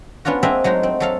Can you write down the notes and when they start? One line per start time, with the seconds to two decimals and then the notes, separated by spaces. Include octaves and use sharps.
0.25 B3 C#4 D4 F4 F#4
0.43 A#3 C4 D4 G#4 D#5 E5
0.64 F#3 G#3 A3 D#4
0.83 C4
1.00 F#3 A4 F5